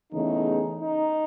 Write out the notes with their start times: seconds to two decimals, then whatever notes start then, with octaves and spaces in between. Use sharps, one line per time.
0.12 E2 C#3 E3 A3 D#4
0.82 D#4